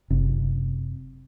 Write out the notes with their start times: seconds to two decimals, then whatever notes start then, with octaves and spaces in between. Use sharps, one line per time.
0.10 F#1 C3